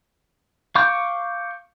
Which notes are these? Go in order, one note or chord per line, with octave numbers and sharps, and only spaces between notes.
F5 C#6 D6 G6